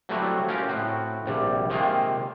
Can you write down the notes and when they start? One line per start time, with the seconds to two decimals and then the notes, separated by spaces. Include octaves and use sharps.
0.09 F#3 G3 A3 C4 E4 F#4
0.48 C#4 F4 G4 A#4
0.69 A2 C4 F#4
1.26 A#1 C3 G3
1.70 C3 D#3 G#3 A#3 C4 F4